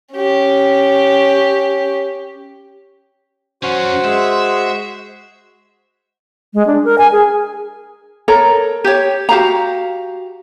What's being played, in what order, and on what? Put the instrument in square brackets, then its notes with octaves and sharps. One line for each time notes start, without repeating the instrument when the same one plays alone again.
[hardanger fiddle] C#4 G4
[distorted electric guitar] F#3 C#4 [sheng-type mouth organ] F#4 C5
[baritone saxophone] G#3 [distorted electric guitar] E5
[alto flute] G#3
D4
A#4
G#5
G#4
[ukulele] A4 A#4 C#5 A#5
G4 C#5
F#4 G4 F5 A#5